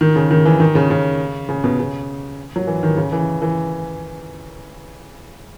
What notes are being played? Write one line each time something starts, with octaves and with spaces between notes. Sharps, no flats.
D#3
C#3
D#3
E3
D#3
C#3
C#3
C#3
B2
C#3
F#3
E3
D#3
C#3
E3
E3